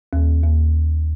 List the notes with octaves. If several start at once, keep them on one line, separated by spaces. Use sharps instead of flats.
D#2
D#2